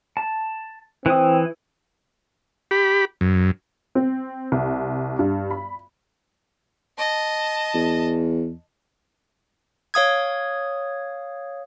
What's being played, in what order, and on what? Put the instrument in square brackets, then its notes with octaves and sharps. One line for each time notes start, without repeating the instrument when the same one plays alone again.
[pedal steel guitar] A5
[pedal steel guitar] E3 D#6 [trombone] C4
[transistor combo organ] G4 B5
F#2
[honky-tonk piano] C4
C2
G2
B5
[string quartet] D#5 A5
[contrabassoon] E2
[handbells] C#5 F5 D#6 G#6